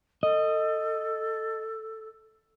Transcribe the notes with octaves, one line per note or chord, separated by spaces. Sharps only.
A4 D#5